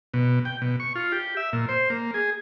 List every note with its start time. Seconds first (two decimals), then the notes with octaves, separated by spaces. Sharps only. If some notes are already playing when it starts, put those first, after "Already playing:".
0.14 B2
0.45 G5
0.62 B2
0.80 C#6
0.95 F4
1.12 G4
1.37 E5
1.53 A#2
1.69 C5
1.90 A#3
2.14 G#4